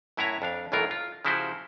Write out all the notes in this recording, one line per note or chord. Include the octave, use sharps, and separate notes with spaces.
F#2 A2 E4 B4 C#5 A#5
F2 D4 F5
B1 F#2 A2 E3 F4 A#4
F4
C#3 F3 E4 F#4 G4 C5